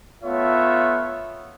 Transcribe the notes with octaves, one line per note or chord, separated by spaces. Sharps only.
A3 B3 F4 C#5 E5